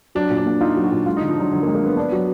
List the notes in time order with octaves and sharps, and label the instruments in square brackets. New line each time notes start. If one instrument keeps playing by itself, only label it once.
[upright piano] F#3 [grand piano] D4
[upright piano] A#2
[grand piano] D4
[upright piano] A#3
[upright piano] D#4 [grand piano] F4
[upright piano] F#3
[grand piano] F#4
[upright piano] A#2
[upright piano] G#3 [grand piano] F4
[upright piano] D3 [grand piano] D#4
[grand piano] F3
[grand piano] F#3 [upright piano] D4
[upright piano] D3 [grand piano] F#3
[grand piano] A#3
[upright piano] G#3
[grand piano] A#3
[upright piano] D3 [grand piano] B3
[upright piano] D4
F#3